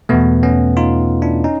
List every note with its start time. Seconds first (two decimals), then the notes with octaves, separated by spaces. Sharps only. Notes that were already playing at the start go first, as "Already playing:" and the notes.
0.09 E2 B2 A3 B3
0.43 B3 C#4
0.77 D#4 F4
1.22 D4 E4
1.44 C#4 D#4